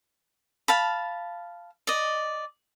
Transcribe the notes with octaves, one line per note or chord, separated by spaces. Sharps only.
F5 A5 B5
D5 D#5